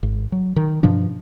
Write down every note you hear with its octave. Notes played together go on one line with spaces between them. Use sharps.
G#1
F#3
D#3
G2 B2 F3 D4